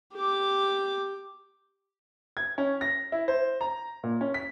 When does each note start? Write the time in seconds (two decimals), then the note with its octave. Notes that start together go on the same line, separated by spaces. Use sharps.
0.14 G4 D6
2.37 G#6
2.58 C#4
2.81 A#6
3.12 E4
3.28 C5
3.61 A#5
4.04 A#2
4.21 C#4
4.34 B6